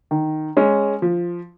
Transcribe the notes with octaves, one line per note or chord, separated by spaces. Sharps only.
D#3
G#3 C#4
F3